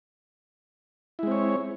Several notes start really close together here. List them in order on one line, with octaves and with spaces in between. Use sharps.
E4 G#3 C4 C#5